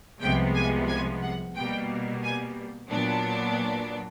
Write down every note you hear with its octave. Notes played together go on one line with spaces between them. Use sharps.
C2 C3 F3 G#3 B3 G5
G#5
G#5
F#5
B2 G3 A#3 G5
G#5
A#2 F#3 B3 D4